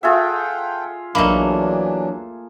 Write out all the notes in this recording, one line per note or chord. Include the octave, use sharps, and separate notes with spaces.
F4 G#4 A4 E5 F#5 G5
B1 E2 F#3 A3 A#3 D4 D#5 B5